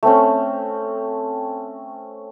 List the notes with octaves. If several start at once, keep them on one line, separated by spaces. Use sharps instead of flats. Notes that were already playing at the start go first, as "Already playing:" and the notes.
A3 C4 C#4